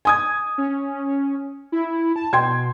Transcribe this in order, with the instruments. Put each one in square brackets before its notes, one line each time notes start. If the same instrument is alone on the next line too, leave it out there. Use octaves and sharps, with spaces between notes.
[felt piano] G#5 D#6 G#6
[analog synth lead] C#4
E4
A5
[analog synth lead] B2 [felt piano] G5 C6 G#6